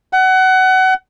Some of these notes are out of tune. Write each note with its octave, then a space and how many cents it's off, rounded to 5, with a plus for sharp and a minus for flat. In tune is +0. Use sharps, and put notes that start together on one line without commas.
F#5 +25